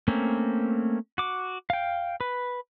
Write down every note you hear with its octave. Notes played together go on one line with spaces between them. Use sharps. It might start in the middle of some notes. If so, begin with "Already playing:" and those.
A3 A#3 C4 C#4
F#4 D6
F5 G5
B4